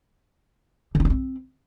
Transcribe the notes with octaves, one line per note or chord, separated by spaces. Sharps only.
D3
D#4
D4
C4